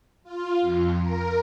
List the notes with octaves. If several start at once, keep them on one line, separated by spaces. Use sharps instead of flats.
F4
F2
A#4